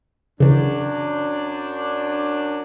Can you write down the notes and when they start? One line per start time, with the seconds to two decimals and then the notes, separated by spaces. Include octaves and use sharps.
0.40 F#2 C#3 E3 D4